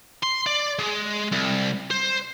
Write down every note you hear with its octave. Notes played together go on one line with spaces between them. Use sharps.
C6
D5
G#3
C2
C5